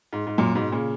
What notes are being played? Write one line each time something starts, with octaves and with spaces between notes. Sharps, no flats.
G#2
G#2
F#2 A#2
G#2 B2
A#2 C#3